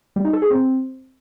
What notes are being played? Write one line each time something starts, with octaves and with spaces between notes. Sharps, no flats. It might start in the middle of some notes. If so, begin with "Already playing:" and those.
G3
D#4
A4
G#4
C4